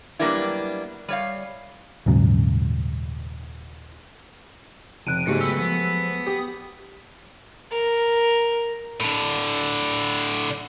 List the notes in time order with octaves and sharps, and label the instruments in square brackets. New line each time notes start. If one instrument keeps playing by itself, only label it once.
[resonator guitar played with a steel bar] F#3 G3 A#3 B3 D4 E4
G3 C#5 F5
[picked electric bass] D#1 G#2 C#3 F#3
[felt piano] F1 [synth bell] F#6 D7 D#7
[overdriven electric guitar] G#2 [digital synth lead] C#3 [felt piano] F#3 G#3 A3 [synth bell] B3 G4 C#7
[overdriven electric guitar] G4 B4 [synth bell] E6
[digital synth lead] F3 [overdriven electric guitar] B3
[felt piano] G4 [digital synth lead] D#6
[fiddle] A#4
[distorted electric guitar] A2 D3